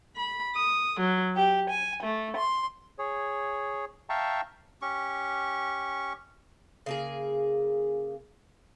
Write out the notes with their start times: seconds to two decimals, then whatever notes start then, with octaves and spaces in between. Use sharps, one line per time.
0.16 B5
0.55 D#6
1.00 F#3
1.36 G4
1.70 G#5
2.03 A3
2.36 C6
2.99 G#4 C#5
4.09 E5 F5 G5 A5 A#5 C#6
4.82 C#4 G4 C#6
6.86 C#3 A#3 G#4